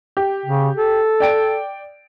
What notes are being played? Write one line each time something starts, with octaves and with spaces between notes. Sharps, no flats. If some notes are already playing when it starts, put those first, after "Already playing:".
G4
C#3
A4
D5 G5 D7